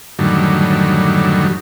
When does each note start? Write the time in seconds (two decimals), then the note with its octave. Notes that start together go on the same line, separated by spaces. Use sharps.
0.19 F#2 A2 D3 D#3 F#3 G3